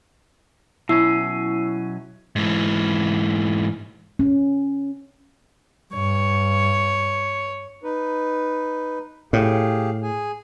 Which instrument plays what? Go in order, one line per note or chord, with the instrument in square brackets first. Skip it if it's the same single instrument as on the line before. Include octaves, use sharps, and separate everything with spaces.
[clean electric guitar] B2 F#3 C#4 [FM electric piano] E4 [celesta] E6 C7
[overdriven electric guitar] G#2 E3
[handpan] C#4
[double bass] G2 [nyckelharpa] C#5
[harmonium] D#4 B4
[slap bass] A2 [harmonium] G4 G#4 F5
[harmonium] G#4 G#5